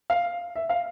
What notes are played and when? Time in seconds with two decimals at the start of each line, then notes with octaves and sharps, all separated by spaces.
0.10 F5
0.56 E5
0.70 F5